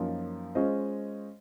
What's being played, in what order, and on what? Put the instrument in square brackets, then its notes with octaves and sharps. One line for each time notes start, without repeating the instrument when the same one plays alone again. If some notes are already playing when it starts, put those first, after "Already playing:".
Already playing: [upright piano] F#2 F3 A#3 D#4
G#3 C#4 F4 C5 D#5